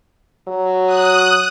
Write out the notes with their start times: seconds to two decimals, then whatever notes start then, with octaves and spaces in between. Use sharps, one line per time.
0.48 F#3
0.86 D#6 F#6